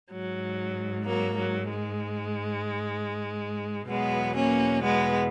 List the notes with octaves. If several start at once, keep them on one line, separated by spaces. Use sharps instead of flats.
G#2 F#3
F#3 A#3
F#3
G#3
E2 B2 F#3 G#3 B3
A#3 C#4
G#3 B3